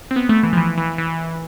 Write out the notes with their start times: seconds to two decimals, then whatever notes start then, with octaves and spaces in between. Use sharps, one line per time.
0.11 C4
0.16 B3
0.29 A3
0.43 E3
0.53 F3
0.57 E3
0.78 E3
0.98 E3